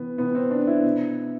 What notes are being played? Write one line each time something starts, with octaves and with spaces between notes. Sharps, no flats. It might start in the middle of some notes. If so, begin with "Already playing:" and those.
Already playing: C3 E3 B3
C3 E3 B3
C4
D4
E4
B2